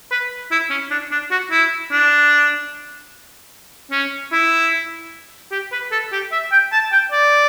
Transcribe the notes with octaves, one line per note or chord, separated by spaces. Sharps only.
B4
E4
C#4
D4
D4
F#4
E4
D4
C#4
E4
G4
B4
A4
G4
E5
G5
A5
G5
D5